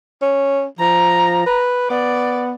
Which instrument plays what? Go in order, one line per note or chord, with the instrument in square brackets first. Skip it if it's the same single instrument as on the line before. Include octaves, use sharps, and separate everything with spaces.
[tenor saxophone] C#4
[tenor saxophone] F3 [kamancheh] A#5
[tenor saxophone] B4
[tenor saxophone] B3 [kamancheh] D5